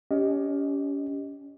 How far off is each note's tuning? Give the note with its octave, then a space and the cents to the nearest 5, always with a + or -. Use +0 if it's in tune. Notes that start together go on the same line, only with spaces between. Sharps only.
C#4 +30 G4 +0 D#5 +0